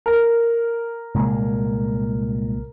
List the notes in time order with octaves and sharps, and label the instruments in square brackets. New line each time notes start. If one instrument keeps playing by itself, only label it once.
[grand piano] A#4
[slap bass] C2 A#2 G#3